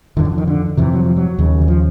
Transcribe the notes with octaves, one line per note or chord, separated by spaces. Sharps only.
F2 D3 E3
D#3
D3
D#3
D3
F2 C3 E3
F#3
F3
F#3
D#2 C#3
E3
F3